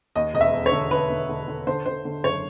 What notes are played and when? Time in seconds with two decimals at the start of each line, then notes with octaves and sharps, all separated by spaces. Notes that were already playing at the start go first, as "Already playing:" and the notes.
0.16 D#2 D#5
0.34 E1 D#5
0.41 E5
0.53 E1
0.66 C#5
0.72 D3
0.91 D3 B4
1.10 D3
1.29 D3
1.48 D3
1.67 D3 C5
1.86 D3 C5
2.05 D3
2.24 F#1 C#5